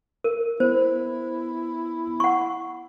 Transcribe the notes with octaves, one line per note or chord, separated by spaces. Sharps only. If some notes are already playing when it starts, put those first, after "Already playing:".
A#4
B3 E4 C5
F#5 C#6